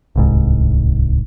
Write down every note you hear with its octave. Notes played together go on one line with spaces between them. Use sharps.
D1 C2 G#2